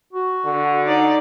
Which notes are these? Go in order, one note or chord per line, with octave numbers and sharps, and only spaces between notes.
F#4
D3
D#4 D5